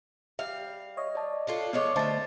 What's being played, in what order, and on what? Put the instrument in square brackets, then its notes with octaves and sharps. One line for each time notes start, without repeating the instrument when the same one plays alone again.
[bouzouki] G3 F5 [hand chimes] E5
[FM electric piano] C#5 D#5
[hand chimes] D5 A5
[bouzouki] D4 F4 A4
[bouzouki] F3 G#3 C#5 [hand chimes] B3 D5 D6
[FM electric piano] D3 A3 [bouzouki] C5 E5 [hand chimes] D#5 A5 A6